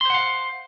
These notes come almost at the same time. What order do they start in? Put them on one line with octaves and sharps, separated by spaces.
C6 C5 F#5 F5